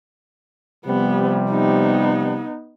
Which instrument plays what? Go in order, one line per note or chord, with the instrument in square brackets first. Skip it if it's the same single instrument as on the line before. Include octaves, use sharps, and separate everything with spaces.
[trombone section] C3 F3 G3 [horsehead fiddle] B3
[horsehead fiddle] B3 D#4